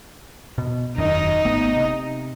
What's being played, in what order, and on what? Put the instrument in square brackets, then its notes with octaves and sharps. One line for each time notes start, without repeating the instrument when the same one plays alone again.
[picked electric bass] B2
[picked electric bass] E1 F#2 D#3 [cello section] D#4
[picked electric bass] G#1 A3 B3
C3